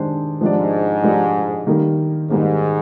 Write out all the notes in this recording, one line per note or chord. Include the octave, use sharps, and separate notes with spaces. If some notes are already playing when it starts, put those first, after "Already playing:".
Already playing: D#3 G#3 D4 G4 C5
G#2 F3 G#3 D4 G4 D5
F3 G#3 D4 G4 D5
D#3 G3 A#3
G#2 D#3 G3 A#3